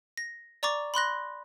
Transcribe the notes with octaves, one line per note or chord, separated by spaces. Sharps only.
A#6
D5 A#5 C#6 D6 A6
B5 C6 F#6 A#6